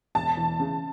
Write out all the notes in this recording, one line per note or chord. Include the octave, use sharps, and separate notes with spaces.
E1 A5
E3
C#3